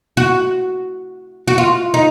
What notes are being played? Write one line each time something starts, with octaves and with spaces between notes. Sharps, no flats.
F#4
F#4
F4
D#4